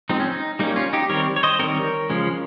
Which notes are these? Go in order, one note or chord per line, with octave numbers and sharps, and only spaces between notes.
F3 G#3 C4 D#4
C#4
D#4
G3 A#3 C#4 D#4
C#4 F4
D#4 G4
D#3 G3 C4 A#4 C#5
C#5
C5 D#5
D#3 G3 C4 A#4 C#5
C#3 F3 G#3 C#4